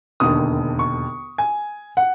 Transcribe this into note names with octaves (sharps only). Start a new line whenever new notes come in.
E1 D#2 D3 D#6
C#6
G#5
F#5